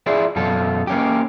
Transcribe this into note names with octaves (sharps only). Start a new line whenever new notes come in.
E4 F4 G#4 D5 E5
F#2 B2 F4 A4
A#3 C#4 G4